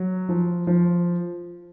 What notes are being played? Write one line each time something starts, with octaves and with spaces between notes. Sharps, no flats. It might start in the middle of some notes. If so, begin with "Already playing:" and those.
Already playing: F#3
F3
F3